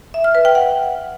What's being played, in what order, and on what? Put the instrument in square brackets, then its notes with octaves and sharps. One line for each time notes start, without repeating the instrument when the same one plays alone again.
[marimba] E5
F6
B4
G5
F#5